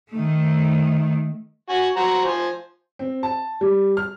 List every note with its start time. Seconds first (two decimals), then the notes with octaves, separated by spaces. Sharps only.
0.11 D#3 A3
1.69 F#4 G#5
1.96 F#4 C5 A#5
2.25 F3 C5 G#5
2.99 C4
3.23 A5
3.61 G3
3.97 F6